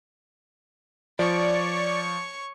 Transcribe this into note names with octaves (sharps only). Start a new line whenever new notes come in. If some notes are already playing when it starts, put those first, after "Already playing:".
F3 C#5 D5 C#6